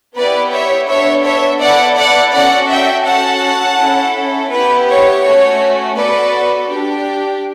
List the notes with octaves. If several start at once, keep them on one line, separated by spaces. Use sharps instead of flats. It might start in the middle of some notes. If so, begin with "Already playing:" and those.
B3 E4 G4 B4 D5
C#5 E5
B3 D4 A4 C#5 E5
C#5 E5
B3 E4 A4 D5 F#5
D5 F#5
C#4 F#4 A4 D5 F#5
E5 G5
C#4 F#4 A4 F#5 A5
C#4 E4 A4
B3 E4 G4 B4
C#5
A3 C#4 F#4
B3 F#4 A4 B4 D5
D4 G4